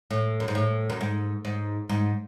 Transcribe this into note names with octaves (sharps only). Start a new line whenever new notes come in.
A2
F#2
G#2
A2
F#2
G#2
G#2
G#2